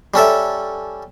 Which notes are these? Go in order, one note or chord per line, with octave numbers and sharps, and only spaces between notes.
G3 C#4 A4 E5